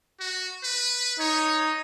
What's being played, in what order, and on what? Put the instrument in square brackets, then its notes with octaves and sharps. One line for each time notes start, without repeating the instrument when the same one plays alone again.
[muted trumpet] F#4
B4
[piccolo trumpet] D#4 [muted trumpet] C#5